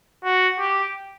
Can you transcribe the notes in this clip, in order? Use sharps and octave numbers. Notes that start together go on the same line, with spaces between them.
F#4
G4